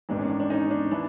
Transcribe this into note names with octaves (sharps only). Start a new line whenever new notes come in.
A1 G#2 D#3 D4
C#4
D4
D4
C#4 D#4
C#4
D4
E3 D4